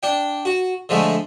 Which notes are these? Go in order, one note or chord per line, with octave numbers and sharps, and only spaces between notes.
D4 G5
F#4
D3 F3 G#3 A3